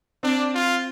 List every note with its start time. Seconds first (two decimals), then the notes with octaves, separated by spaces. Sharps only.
0.23 C4 D4
0.54 F4